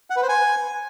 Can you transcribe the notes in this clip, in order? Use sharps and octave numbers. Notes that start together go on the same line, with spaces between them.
F#5
B4
C5
G#5